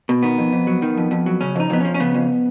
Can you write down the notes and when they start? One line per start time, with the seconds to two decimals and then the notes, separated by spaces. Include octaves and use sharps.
0.09 B2
0.23 D#3 B3
0.38 F2
0.52 F2
0.67 F#3
0.82 D#3
0.97 F2
1.11 F2
1.26 F#3
1.41 C#3 C#4
1.56 F2 D#4
1.70 F2 B3
1.80 F3 C#4
1.94 C#4
2.00 C#3 B3
2.14 F2